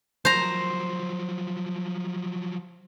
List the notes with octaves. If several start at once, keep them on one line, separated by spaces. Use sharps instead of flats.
F3 F#3 C5 A#5